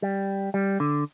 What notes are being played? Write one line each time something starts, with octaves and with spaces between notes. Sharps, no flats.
G3
G3
D3